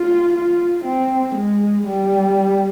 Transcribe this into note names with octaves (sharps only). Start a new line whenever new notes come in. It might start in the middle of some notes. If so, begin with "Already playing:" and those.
Already playing: F4
F4
C4
G#3
G3